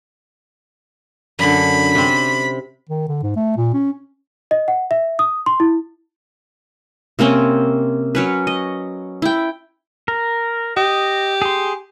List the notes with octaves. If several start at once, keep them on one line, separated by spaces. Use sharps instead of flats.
F#2 D3 B5
C3 C4
D#3
D3
G#2
A3
A#2
C#4
D#5
F#5
E5
D#6
C6
E4
C3 A#3 C4 C#4
F#3 C#4 B4
D#5
E4 G5
A#4
G4 D#5
G#4 C6